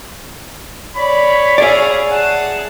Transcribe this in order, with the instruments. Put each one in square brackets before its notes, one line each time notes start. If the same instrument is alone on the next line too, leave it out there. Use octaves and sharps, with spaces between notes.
[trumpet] C#5 [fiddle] D5 [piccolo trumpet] B5
[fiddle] G#4 F5 [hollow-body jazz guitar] D5 E5 [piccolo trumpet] G#5
[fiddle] G#4 A5 [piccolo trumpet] F#5